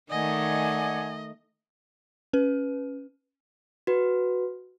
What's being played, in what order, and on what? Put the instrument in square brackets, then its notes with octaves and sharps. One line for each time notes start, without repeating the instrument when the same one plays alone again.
[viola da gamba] D#3 A3 [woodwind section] D5 F#5 G#5 [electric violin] D#5
[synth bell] C#4 B4
[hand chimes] F#4 B4